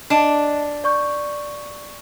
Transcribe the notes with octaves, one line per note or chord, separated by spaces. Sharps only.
D4 D#5 A5 E7
D5 C#6 G6